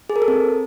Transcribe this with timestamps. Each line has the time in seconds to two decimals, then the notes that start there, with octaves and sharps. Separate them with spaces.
0.10 G#4
0.16 A#4
0.22 A4
0.28 C4